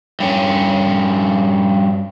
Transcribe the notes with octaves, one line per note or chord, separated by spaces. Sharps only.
G2 C#4